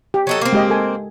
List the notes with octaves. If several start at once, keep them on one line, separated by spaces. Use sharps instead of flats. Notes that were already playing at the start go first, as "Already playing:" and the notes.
G4
F#3 D#4 A4
A#3 C4
G#3 G4 D#5
A4 A#4 G#5